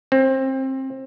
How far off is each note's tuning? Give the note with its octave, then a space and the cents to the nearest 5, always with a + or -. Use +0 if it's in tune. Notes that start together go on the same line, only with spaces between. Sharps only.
C4 +25